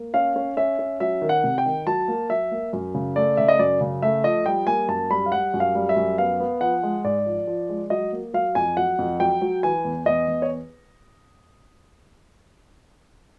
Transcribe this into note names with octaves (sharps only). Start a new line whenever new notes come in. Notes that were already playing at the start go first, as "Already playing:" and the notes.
Already playing: A#3
C#4 F5
C#4
C#4 E5
C#4
F#3 E5
D#3
F#5
C3
G5
D#3
F#3 A5
A#3
F#3 E5
A#3
F#2
C#3
A3 D5
C#3 E5
D#5
F#2 D5
C#3
A3 E5
F3 D#5
G3 G5
A#3 G#5
F#2 A5
G3 B5
F5
G3 F#5
F#2
F5
G3
E5
F#2
B3 F5
B3
F3 F#5
G#3
G#2 D5
F3
F3
G#3
F#3 D#5
A#3
F#3 F5
F2 G#5
F#3 F#5
F2
F#3 G5
F#3
E3 G#5
E2
E2 D#5
E2
C#5